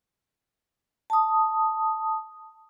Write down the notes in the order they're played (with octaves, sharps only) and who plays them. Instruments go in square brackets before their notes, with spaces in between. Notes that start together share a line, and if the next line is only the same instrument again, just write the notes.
[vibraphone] A5 D#6